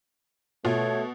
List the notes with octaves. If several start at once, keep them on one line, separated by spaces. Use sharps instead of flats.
B2 A3 F4 C#5